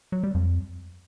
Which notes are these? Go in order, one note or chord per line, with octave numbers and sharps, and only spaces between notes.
F#3
G3
F2